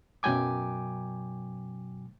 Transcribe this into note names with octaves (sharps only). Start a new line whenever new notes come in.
F#2 B2 F#3 G5 G#5 D6